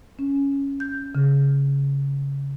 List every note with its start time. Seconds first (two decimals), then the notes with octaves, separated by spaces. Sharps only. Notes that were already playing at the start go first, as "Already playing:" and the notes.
0.19 C#4
0.80 G6
1.15 C#3